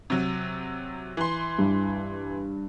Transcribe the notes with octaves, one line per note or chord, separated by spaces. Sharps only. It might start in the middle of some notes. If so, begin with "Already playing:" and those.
C3 F#3
E3 C6
G2